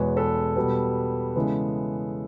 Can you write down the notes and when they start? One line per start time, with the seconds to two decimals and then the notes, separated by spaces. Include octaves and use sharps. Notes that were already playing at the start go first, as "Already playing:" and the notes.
Already playing: E2 B2 G#3 B3 B4 C#5
0.16 A4 B4
0.56 B2 G3 B3
1.36 C#3 E3 G#3 B3